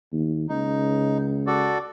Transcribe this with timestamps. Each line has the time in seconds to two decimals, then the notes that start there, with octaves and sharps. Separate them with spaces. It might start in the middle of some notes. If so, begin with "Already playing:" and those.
0.12 D#2
0.49 C#2 D#4
1.47 F#4 A4 D5